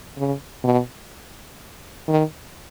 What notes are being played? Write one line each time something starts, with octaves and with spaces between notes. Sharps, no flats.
C#3
B2
D#3